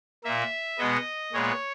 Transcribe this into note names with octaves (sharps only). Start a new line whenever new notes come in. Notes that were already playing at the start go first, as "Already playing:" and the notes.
A#2 A#3 E5
B2 G#3 B3 D#5
A#2 G#3 B3 C#5